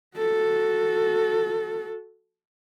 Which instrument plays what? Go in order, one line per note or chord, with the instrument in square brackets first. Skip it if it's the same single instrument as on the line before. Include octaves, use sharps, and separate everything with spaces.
[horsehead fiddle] F#4 A4